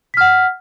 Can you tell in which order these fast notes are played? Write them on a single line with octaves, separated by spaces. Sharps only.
B6 F6 F#5